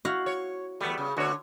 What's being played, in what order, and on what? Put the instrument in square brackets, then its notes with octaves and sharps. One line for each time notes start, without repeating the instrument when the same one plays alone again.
[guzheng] E4 F#4 F5
[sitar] C#5
[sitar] E2 A3 [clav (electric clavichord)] G3 B3
[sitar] C#3
[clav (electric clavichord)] D2 B2 F#4 [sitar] D3 C#5